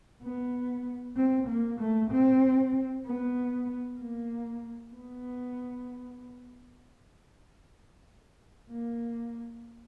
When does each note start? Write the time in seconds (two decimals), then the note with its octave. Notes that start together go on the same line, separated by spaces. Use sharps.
0.23 B3
1.17 C4
1.48 A#3
1.80 A3
2.11 C4
3.05 B3
4.00 A#3
4.94 B3
8.70 A#3